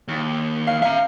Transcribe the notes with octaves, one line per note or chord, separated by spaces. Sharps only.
D#2
F5
E5 F5 A#5